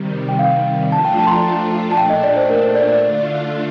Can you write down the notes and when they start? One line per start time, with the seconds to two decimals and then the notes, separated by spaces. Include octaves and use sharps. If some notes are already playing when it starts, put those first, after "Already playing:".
Already playing: C3 D#3 G3
0.29 G5
0.39 F5
0.92 F3 A3 D4 F4 A5
1.05 G5
1.19 A5
1.27 C6
1.31 A#5
1.91 A5
1.97 A#2 A3 D4 G5
2.10 D#5
2.24 D5
2.37 C5
2.50 A#4
2.63 C5
2.75 D5
2.89 D5
3.02 D3 A3 D4 F4